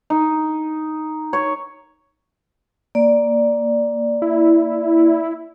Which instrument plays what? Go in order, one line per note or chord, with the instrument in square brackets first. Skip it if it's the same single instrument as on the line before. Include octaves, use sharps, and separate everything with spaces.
[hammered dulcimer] D#4
C#5
[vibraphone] A#3 D5
[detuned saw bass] E4